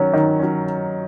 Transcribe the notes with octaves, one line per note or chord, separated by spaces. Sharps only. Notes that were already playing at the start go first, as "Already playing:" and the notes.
Already playing: D#3 F#3 C#4
D#3
F#3 C#4